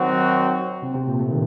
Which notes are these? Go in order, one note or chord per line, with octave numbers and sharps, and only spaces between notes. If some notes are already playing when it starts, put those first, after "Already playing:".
Already playing: D#3 F#3 C4 F#4
C3 C4
C3 C4
A#2 A#3
A2 A3
D#3